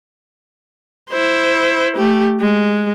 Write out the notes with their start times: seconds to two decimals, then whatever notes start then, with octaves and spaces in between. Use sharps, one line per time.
1.10 E4 C5
1.96 A3 G4
2.40 G#3